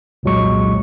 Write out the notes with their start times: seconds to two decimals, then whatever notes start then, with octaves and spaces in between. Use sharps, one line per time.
0.23 C2 F2 A#2 F#3 G#3 C#6